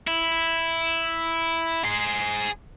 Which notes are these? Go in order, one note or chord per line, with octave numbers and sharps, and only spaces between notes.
E4
G#4 C5